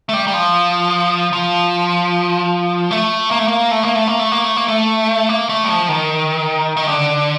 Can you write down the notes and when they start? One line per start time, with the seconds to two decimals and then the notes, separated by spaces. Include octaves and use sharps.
0.09 A3
0.14 G3
0.28 G3
0.34 F3
1.33 F3
2.91 A3
3.31 A#3
3.39 A3
3.48 A#3
3.71 A3
3.83 A#3
3.95 A3
4.08 A#3
4.20 A3
4.32 A#3
4.44 A3
4.56 A#3
4.68 A3
5.29 A#3
5.49 A3
5.64 G3
5.69 F3
5.89 D#3
6.77 D#3
6.88 D3